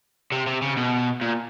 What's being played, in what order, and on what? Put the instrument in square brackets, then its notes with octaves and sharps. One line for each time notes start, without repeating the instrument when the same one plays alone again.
[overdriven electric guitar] C3
C3
C#3
B2
A#2